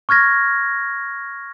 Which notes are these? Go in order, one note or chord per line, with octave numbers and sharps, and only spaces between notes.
C#6 F6 G#6 A#6